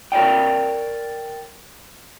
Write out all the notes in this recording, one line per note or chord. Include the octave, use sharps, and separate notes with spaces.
A#4 C#5 D5 G5